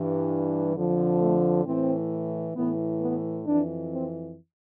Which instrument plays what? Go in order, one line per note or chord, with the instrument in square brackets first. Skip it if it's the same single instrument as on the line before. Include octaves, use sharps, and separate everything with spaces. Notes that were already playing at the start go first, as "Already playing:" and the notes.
Already playing: [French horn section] G2 E3
F2 D3 F3
A3
A2 E3 C4
A2 E3 B3
B3
F2 E3 D4
C4